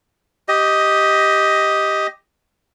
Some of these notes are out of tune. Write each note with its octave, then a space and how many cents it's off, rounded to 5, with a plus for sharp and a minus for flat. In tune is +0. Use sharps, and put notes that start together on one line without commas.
G4 +0 D#5 +10